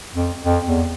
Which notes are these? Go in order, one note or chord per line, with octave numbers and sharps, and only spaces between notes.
F2
F2
E2